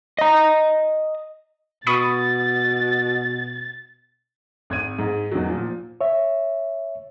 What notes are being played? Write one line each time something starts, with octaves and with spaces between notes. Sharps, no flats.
D#5 A#5
B2 B5 C#6 D#6 A6
G#1 G#6 D#7
G#2
E2 D#3 F#3
A#2 F3
C#5 E5